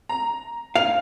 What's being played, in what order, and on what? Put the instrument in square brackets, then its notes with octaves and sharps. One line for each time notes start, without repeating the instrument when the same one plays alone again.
[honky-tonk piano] A#5
[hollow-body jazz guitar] F5 [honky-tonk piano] F7